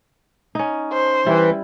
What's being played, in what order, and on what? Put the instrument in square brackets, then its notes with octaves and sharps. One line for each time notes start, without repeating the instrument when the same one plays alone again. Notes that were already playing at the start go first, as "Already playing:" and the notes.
[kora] C#4 D#4
[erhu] C5
[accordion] E3 [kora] G3 E4